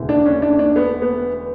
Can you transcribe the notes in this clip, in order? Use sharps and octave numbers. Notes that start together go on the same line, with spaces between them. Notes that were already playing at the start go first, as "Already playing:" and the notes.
Already playing: E1 D2 C#3 E3
D4
C#4
D4
D4
B3
B3